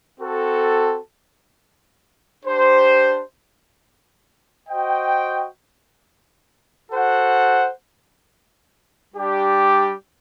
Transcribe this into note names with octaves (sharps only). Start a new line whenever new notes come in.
C4 F#4 A4
D4 G4 C5
F#4 C5 D#5 G5
F#4 A4 C5 F#5
G3 D4 G4 D5